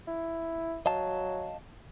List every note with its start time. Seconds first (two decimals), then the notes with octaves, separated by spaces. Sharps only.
0.08 E4
0.86 F#3 D#5 F5 A5